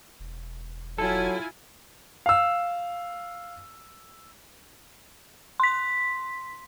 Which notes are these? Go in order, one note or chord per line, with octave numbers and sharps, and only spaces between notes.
E1
F#3 E4 F4 A4 G#5
F5 E6
C6 B6